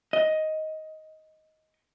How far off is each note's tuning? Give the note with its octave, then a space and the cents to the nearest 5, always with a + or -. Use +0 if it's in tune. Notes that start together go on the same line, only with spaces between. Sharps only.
D#5 +10